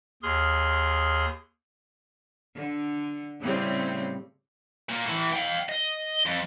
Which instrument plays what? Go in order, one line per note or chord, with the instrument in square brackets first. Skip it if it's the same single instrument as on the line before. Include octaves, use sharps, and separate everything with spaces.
[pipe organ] D#2 G#4 C6 F6
[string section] D3
A2 C#3 G3 C4
[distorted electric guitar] A#2 A#3
A2 E3
F5 G5
D#5
F2